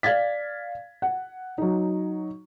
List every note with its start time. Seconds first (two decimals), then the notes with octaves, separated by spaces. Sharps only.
0.03 D5 F5 G#6 A6 B6
1.02 F#5
1.58 F#3 D#4